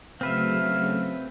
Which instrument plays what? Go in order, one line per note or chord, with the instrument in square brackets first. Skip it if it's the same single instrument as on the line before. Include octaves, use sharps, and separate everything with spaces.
[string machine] C#3 F#3 A3 [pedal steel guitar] C4 B4 E5 [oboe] F5